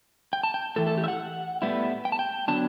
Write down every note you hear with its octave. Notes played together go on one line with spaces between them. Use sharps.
G5
A5
G5
A2 E3 A3 A4
A4
G4
E5
F#5
A2 G3 B3 E4
G5
A5
G5
D3 F#3 B3 D4 A5